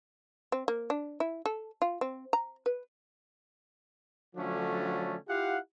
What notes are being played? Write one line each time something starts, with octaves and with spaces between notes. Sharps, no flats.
C4
A#3
D4
E4
A4
F4
C4
A#5
B4
D3 F3 F#3 A3 C#4 D4
E4 F4 G4 F5 F#5